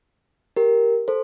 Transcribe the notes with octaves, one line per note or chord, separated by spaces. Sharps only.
G4 A#4
A4 C5